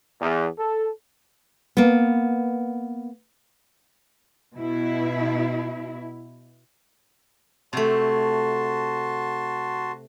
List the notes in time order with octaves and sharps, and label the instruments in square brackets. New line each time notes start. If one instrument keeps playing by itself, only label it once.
[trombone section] E2
A4
[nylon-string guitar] A#3 B3
[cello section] B2 E4
[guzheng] C3 A3 [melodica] F#4 A5 C6